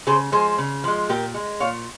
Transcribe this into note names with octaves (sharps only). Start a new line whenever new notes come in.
C#3 G#4 C5
F3 G#3 G#4 C5
C#3
F3 G#3
A#2 G4 A#4
G#3
A#2 C#5 F5